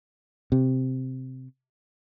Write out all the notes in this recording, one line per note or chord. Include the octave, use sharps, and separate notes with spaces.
C3